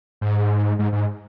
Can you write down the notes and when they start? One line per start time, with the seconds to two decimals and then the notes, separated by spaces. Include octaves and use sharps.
0.21 G#2
0.79 G#2
0.92 G#2